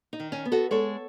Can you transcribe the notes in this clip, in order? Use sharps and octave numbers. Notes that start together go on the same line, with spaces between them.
D#4
D#3
C#4
B3
F#4 A4
G#3 A4 C#5